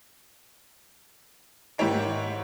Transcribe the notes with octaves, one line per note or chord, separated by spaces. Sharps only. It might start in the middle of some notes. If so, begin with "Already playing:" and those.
G#2 D#3 E4 G4 C#5 D7